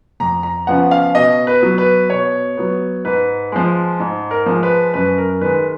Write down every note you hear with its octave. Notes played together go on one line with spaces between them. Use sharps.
F2 A#5
A#5
C#3 F3 B3 F#5
F5
B2 D#5
B4
F#3 B3
B4
B2 C#5
F#3 B3
G#2 B4
F3 G#3
G#2
A#4
F3 G#3
B4
F#2 B4
A#4
D#3 G#3 B4